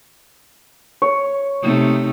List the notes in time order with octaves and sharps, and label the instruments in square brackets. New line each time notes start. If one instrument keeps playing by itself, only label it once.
[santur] C#5
[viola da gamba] C3 A3 D#4